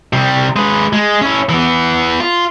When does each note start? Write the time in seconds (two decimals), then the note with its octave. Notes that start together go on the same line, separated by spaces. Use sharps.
0.13 C3 G3
0.56 G#3 B4
0.93 G#3
1.21 C#4 E4
1.49 E3 B3
2.20 F4